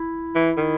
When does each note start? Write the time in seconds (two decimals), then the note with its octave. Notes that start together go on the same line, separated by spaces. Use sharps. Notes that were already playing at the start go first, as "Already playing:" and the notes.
Already playing: E4
0.35 E3
0.57 D#3